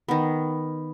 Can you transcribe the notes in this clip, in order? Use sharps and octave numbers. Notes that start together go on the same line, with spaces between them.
D#3 B3